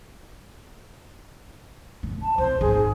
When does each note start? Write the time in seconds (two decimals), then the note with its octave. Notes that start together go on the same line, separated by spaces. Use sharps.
2.03 D3
2.22 A5
2.38 C2 C5
2.61 G#1 D#2 G#4